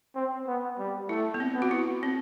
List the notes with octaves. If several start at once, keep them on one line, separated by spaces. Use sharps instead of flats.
C4
B3
G3
A3 E4
B3
C4
B3
F#4
E4
C4